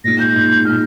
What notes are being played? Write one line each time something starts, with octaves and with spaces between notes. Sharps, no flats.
A#2 G#3 D#4 A#6
G6
A#2 G#3 D#4
A#2 G#3 D#4 F6